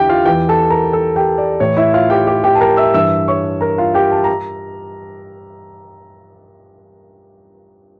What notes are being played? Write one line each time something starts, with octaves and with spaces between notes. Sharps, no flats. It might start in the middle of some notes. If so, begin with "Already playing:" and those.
Already playing: E2 D3 E4 G4 G5
F4 F5
E2 E3 G4 G5
A4 A5
A#4 A#5
A4 A5
G4 G5
D5
A2 E3 C#5
E4 E5
F4 F5
G4 G5
G4 G5
G4 G5
A5
A#4 A#5
E5 E6
G2 E3 E5 E6
C#5 C#6
A#4 A#5
F4 F5
G4 G5
A5
A#5